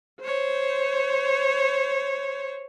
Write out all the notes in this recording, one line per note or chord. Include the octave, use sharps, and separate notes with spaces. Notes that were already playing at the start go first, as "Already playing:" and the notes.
C5 C#5